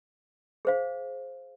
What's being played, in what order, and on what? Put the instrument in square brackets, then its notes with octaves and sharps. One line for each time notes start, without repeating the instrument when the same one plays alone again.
[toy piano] G#4 C5 F5